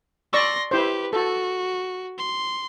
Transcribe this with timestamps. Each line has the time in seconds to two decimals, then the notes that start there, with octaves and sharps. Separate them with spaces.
0.33 D5 C6 C#6 E6 A#6
0.71 E4 G4 B4 C5
1.13 F#4 A4
2.18 C6